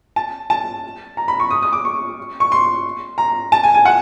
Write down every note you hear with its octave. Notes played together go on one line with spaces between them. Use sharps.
A5
A5
A#5
B5
C#6
D#6
D#6
D6
C#6
C#6
C6
A#5
A5
G#5
G#5
F#5